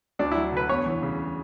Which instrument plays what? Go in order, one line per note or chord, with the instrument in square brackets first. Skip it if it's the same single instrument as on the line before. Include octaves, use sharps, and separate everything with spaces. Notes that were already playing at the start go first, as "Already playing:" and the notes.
[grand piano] D2 [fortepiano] D4
[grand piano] F#3 [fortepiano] E4
[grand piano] D3 [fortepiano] B4
[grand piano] E2 [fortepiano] C#5
[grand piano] E3
C#3